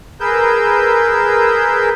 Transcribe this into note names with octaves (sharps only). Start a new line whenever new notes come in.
G#4 A#4 B4 E6 G6